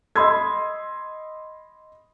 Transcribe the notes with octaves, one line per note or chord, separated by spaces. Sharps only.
D#5 B5 C6 D#6 E6 G#6